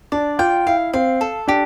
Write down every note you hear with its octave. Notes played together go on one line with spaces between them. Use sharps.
D4 D5
F4 G5
E4 F5
C4 F5
A4
D4 G4